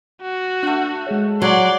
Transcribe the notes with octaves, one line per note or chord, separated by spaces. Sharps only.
F#4
A3 D4 F#5
G#3 G#4 C#5
F#3 D5 F#5 G#5 A#5 C6